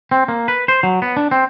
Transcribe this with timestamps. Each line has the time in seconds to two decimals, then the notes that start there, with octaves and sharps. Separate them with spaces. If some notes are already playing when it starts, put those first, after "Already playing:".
0.11 C4
0.28 A#3
0.48 B4
0.68 C5
0.83 F#3
1.02 B3
1.17 D4
1.31 C4